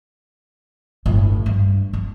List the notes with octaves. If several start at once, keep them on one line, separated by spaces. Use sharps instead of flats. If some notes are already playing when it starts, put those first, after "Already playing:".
G1 A2
G2
D4